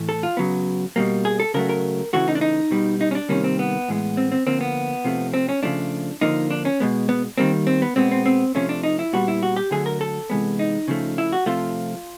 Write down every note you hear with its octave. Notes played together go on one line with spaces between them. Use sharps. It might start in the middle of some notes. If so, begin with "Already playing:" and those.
Already playing: A2 E3 A3
A4
F4
C#3 F#3 B3
B2 G3 A#3
G#4
A4
C#3 F#3 A3 A#4
A#4
C#3 E3 A3 F#4
D#4
D4
D#4
B2 G3 B3
D#4
C#4
D4
C3 D#3 G3 A#3 C#4
C4
B3
A2 E3 G#3 B3
C4
C4
D3 F3 A#3 C4
B3
C3 F3 A3
C4
C#4
C#3 F3 A3 D4
D3 F3 A#3 D#4
D4
C#4
B2 G#3 B3
B3
D#3 G3 A#3 C4
C4
B3
B2 G#3 B3 C4
C4
C4
C3 F3 A3 C#4
D4
D#4
E4
A#2 G3 B3 F#4
E4
F#4
G4
D3 F#3 A3 G#4
A#4
A4
C3 E3 G#3 B3
D#4
C#3 F3 A3
E4
F#4
C3 F3 A3 F4